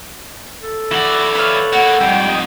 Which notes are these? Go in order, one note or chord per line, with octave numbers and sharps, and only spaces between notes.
A4
E3 E4 F#4 D5 F#5
E4 B4 C#5 F5 F6
A#3 F#4 F#5
F2 G#2 G3 G5
D#5